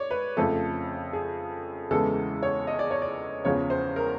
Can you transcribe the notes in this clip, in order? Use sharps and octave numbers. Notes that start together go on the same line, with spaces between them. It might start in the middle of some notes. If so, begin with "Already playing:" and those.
Already playing: C#5 D5
B4
F2 C#3 F3 A3 A4
G#4
E2 C#3 E3 G#3 A4
C#5
D#5
D5
C#5
D5
E2 C#3 F3 C#5
C5
A#4